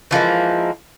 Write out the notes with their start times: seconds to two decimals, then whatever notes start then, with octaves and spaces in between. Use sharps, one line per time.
0.11 E3 F3 G#3 A#3